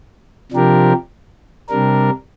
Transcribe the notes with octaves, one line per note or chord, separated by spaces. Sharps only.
C3 F3 D4 G4 A#4
C3 G3 D4 A#4